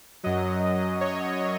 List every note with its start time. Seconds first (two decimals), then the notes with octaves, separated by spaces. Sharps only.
0.24 F#2 F#3 D#5
1.01 C#5